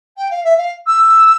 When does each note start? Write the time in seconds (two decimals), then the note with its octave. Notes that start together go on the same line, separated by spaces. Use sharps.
0.17 G5
0.30 F5
0.44 E5
0.57 F5
0.87 E6